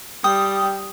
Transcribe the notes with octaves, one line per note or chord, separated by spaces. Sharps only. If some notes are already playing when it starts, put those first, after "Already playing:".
G3 G5 D#6